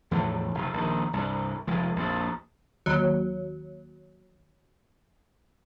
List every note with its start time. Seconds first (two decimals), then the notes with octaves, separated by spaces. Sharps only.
0.11 E2 A2 D3 F3
0.55 F1
0.73 A#1 D#3
1.13 C2 G2
1.67 F1 F3 G#3
1.96 A#1 F2
2.86 D#2 F#3